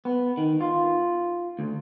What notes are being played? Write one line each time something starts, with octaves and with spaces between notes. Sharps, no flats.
B3
D#3
F4
D2